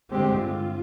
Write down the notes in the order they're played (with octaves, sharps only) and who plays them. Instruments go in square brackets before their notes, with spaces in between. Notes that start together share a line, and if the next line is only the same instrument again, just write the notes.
[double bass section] G2 D3 G#3 C4 [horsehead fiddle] G4
[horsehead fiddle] F4